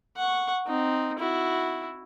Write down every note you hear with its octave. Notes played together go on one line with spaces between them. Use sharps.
F#5 C#6
C4 D#4
E4 F#4